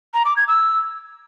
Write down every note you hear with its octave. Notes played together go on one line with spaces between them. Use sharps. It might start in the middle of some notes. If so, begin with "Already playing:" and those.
A#5
D6
G#6
E6